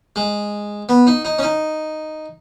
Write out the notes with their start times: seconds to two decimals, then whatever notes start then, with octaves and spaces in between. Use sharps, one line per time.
0.16 G#3
0.89 B3
1.07 D#4
1.25 D#4
1.39 C#4
1.43 D#4